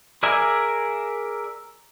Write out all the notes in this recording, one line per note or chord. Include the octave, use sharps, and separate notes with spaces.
G#4 A#4 D5 E5 G#5